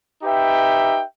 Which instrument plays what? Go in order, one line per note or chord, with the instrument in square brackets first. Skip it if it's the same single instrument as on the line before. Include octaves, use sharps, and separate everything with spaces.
[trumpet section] D#4 G4 B4 E5 G5